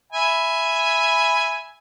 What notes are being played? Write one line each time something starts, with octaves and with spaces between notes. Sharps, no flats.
E5 G#5 B5